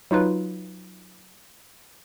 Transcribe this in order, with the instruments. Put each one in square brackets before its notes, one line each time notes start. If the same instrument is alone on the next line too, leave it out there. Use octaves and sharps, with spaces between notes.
[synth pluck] F#3 D#4 F4 B4